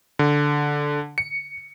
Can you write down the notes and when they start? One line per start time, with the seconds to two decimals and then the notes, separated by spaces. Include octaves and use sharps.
0.19 D3
1.18 C#7